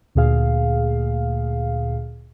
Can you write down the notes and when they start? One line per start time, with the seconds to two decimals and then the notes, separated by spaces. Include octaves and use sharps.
0.15 D2 A#2 G#4 F5